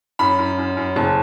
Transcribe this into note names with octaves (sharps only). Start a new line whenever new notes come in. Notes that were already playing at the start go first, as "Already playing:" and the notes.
F#2 B5
F#2
F#2
F#2
F#1 A5